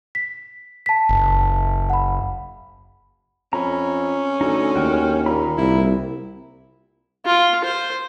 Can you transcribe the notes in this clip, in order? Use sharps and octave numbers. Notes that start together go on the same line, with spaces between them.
B6
A5 B6
F#1
F#5 B5
F2 C#4 A#5 B5
D2 D#4 A4
D#2 F#4 G5 F6
A#2 A#5 B5
C2 E4
F4
C5